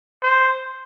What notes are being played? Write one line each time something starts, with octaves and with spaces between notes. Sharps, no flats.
C5